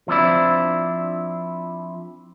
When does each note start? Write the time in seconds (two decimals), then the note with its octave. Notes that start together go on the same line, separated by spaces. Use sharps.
0.08 F3 C4 D4 E4